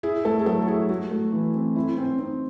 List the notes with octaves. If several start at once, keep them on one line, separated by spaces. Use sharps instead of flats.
E4 G#4
A3 A4
G#4
F#3 A4
E4 G#4
A3 F#4
A3
E3
C4
C4 E4
C4 C#4
C4 D#4